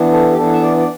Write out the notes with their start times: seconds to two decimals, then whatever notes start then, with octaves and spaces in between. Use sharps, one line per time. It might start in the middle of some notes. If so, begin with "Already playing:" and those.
Already playing: E3 B3 D4
0.12 A4
0.31 G4
0.38 E3 B3 D4 A4
0.53 E5
0.61 D5
0.77 D5